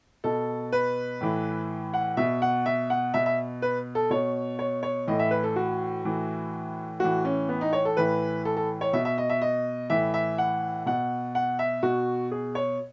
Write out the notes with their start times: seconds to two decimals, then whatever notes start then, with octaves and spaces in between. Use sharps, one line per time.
0.24 B2 A4
0.72 B4
1.21 A2 E3
1.94 F#5
2.17 B2 E5
2.42 F#5
2.66 E5
2.90 F#5
3.14 B2 E5
3.26 E5
3.62 B4
3.95 A4
4.10 B2 C#5
4.59 C#5
4.83 C#5
5.07 A2 E3 D#5
5.19 E5
5.31 B4
5.44 A4
5.56 F#4
6.04 A2 E3
7.00 A2 E3 F#4
7.25 C#4
7.49 B3
7.61 D#4
7.73 C#5
7.85 A4
7.97 A2 E3 B4
8.45 A4
8.57 A4
8.81 C#5
8.93 B2 E5
9.05 E5
9.18 D#5
9.30 E5
9.42 D#5
9.90 A2 E3 E5
10.14 E5
10.38 F#5
10.86 B2 F#5
11.35 F#5
11.59 E5
11.83 B2 F#4
12.32 G#4
12.55 C#5